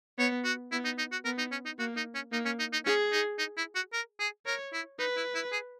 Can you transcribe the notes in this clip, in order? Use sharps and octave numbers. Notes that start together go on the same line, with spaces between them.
B3 C#5
F#4
B3 E4
D#4
D#4
F#4
B3 A#4
D#4
C#4
D#4
A#3 F#4
D#4
C#4
A#3 D#4
C#4
D#4
D#4
C#4 G#4
D#4
D#4
E4
F#4
A#4
G#4
A#4 C#5
E4
D#4 B4
E4
E4
G#4